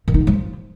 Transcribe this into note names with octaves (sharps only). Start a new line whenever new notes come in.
D#3
D#4
D3
F#3
F3